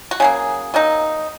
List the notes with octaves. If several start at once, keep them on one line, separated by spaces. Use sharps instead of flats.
F#4
C#3 F#3 A#3 G#4
F#3 A#3 D#4